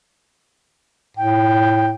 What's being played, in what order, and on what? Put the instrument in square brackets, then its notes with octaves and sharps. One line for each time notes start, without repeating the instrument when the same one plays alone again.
[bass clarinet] A2 [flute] G5